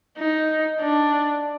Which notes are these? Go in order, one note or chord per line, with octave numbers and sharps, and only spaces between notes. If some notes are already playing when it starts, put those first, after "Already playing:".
D#4
D4